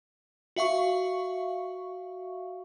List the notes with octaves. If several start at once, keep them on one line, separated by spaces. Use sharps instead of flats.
F#4 E5 F5 C#6